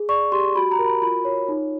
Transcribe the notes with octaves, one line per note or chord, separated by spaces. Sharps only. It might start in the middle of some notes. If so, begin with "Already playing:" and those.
Already playing: G#4
D5 C#6
G4 C6
F#4 B5
A#5
A#4
B5
F4 B5
C#5
D#4